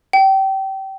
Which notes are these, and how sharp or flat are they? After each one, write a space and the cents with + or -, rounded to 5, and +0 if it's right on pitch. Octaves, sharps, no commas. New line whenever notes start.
G5 -25